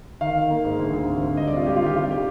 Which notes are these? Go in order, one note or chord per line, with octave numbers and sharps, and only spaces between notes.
D#3 F5
D#3
A#3
G#2
D2
D2
C3
D2
G3 D#5
D5
C3
F4
G3 G4
F4
D#3 G4
C3 F4
C4 G4